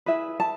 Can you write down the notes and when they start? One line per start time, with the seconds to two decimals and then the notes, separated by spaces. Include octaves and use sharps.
0.06 E4 G#4 B4 E5
0.40 A5